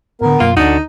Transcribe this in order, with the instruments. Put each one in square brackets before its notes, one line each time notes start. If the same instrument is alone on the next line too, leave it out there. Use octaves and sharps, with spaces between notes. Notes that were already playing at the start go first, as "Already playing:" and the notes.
[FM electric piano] A2 D3 [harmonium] B3 A#4
[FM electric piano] F#2 B2 [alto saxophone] A#3 [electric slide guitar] F4
[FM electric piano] D2 [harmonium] D3 [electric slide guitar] D4 F#4 [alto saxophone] D#4